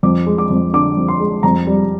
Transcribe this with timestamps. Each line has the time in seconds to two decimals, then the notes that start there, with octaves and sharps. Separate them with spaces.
0.03 F2 D6
0.26 G#3
0.38 D6
0.50 F2
0.73 D3 D6
0.97 F2
1.08 C6
1.20 G#3
1.43 F2 A#5
1.67 G3